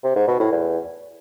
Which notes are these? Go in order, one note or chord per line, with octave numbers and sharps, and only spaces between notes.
C3
G#2
B2
A2
E2